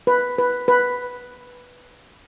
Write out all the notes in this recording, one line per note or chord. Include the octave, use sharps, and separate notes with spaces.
B4
B4
B4